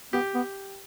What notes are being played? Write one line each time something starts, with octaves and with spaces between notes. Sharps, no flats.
B3 G4
B3